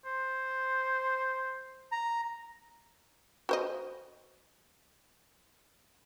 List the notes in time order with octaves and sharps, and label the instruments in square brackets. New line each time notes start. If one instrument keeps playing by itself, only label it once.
[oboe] C5
[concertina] A#5
[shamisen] F#4 C5 D#5